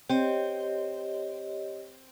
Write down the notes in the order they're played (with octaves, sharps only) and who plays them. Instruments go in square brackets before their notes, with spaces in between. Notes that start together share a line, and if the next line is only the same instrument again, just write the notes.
[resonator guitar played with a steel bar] C4 [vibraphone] G4 C#5 D#5